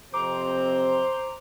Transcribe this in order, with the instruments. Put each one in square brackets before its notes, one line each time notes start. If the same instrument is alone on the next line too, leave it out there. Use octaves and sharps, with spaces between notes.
[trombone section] F2 C3 C4 [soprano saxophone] C5 [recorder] A#5 [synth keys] D6